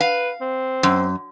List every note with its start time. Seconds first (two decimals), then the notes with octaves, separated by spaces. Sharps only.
0.01 B4 F5
0.41 C4
0.83 F#2